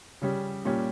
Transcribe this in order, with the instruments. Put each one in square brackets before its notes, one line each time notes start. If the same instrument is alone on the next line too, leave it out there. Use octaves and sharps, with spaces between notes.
[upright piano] C#3 G3 C#4
A#2 G3 C#4